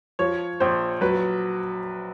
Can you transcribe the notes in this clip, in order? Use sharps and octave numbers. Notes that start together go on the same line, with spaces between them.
F3 C#5
A#1 C5
F#3 B4